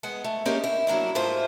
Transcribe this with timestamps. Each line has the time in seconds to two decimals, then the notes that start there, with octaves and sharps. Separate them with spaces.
0.03 G#3 B3 F#5
0.24 A3
0.45 G#3 A#3 C#4 D#4 G4 G#4
0.64 E4
0.87 F#3 A#3 D4 E4
1.15 G#2 A3 E4 F4 C5